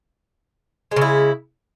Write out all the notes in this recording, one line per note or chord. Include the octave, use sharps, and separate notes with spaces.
C#3 G#3 E4